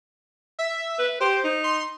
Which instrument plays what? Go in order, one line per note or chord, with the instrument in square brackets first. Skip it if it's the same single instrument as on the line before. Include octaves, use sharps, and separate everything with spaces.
[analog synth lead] E5
[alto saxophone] B4
[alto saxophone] G4 [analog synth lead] C5
[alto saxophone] D#4
[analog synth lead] C6